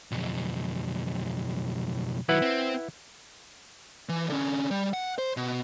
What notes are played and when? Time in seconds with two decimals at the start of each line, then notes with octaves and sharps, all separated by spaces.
0.12 B1 F2
2.29 D#3 F#3 E4 B4 F#5
2.42 C4
4.09 E3
4.29 D3 C#4
4.71 G3
4.94 F#5
5.18 C5
5.37 B2